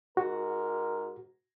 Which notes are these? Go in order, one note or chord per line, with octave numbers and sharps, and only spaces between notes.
G#2 F#4 A#4